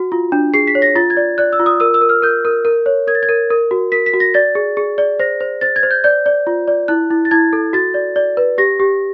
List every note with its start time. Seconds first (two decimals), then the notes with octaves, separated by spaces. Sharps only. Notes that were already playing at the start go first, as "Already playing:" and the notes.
Already playing: F#4
0.12 F4
0.32 D4
0.54 G#4 C7
0.67 B6
0.75 C#5
0.82 A#6
0.96 F4 A6
1.10 G#6
1.17 D5
1.38 D5 F#6
1.53 E6
1.59 F4
1.66 D#6
1.80 A#4 E6
1.94 E6
2.02 A#4
2.09 F6
2.22 A#4 G6
2.45 A#4
2.65 A#4
2.86 C#5
3.07 A#4 G#6
3.15 A6
3.23 G#6
3.29 A#4
3.50 A#4
3.71 F#4
3.92 A#4 B6
4.06 B6
4.14 F#4
4.20 A#6
4.34 D5 A6
4.55 G#4
4.77 G#4
4.98 D5
5.19 C5 A#6
5.40 C5
5.61 C5 A6
5.76 G#6
5.83 C5
5.91 G6
6.04 D5 G6
6.26 D5
6.47 F4
6.68 D5
6.88 E4 F#6
7.11 E4
7.25 A6
7.31 E4 G#6
7.53 A4
7.73 F#4 A6
7.94 D5
8.16 D5
8.37 B4
8.58 G4 A#6
8.80 G4